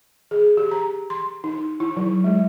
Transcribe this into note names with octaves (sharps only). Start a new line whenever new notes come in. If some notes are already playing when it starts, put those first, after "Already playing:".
G#4
G4
A#5
C6
D#4
E4
F#3
G#3